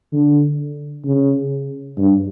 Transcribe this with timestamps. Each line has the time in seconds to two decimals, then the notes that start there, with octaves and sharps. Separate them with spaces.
0.13 D3
1.05 C#3
1.98 G2